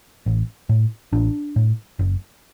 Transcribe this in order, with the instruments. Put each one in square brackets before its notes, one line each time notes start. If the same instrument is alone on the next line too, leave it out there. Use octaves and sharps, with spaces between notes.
[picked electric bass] A1
A2
A1 D4
A2
F#1